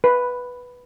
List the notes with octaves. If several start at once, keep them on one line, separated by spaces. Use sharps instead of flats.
B4